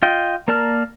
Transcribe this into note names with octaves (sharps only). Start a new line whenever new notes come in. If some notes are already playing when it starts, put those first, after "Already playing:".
F4 D#5 G5
A#3 A#4 D5 A5 F6